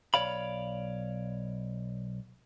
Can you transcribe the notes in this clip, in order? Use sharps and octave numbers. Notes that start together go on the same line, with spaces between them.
B1 F2 C#5 D5 F5 B5